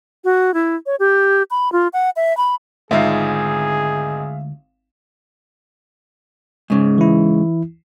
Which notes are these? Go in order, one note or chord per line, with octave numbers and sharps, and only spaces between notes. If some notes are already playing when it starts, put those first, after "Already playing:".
F#4
E4
C#5
G4
B5
F4
F#5
E5
B5
G#1 D2 G#3 D#4 F4 G#4 E5 F5
G#2 C#3
E3 E4